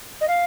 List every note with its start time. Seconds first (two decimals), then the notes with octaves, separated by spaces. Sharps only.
0.21 D#5
0.28 F5